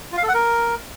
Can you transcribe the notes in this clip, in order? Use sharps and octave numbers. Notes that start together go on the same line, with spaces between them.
F4
F5
A4
F#5
A#4